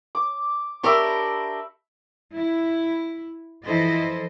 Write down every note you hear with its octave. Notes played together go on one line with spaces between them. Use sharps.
D6
D4 G4 A#4 E5 B5 C#6
E4
E3 F3 E4 A4 C5 D#5